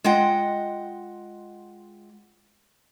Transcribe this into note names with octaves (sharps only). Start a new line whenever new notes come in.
G#3 F4 D#5 F#5 G5